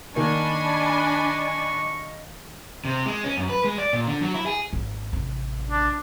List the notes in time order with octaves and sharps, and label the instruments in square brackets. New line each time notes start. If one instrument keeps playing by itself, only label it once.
[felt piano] D#3 A#3 [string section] D4 G#5 B5 [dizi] D#5 [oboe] C#6
[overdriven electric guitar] C3
G#3
C#4
F#2
B4
G#3
D5
A#2
D3
F#3
E4
G#4
[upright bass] G#1
A1 C3
[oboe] D4